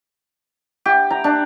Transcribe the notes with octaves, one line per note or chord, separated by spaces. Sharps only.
G4
A#5
D4